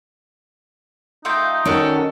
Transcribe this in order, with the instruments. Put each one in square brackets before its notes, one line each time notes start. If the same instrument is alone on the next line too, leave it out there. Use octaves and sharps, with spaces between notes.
[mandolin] A3 F4 G5 [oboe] D#4
[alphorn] D#3 [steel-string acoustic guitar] C#4 [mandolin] F#4 A4 D5